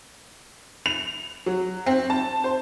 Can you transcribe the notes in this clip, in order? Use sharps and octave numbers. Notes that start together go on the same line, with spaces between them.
F7
F#3
C4
A5
C5